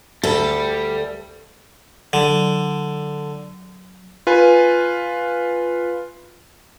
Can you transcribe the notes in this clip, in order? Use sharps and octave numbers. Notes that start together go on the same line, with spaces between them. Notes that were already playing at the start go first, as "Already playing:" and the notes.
D2 G3 A4 B5
D3 F#3
F4 B4 G#5